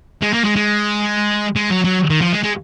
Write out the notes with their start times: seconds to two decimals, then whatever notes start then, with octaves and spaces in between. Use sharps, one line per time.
0.22 G#3
0.34 A#3
0.45 G#3
0.56 G#3
1.56 G#3
1.70 F#3
1.85 F#3
2.10 D#3
2.21 F3
2.33 G#3
2.43 G#3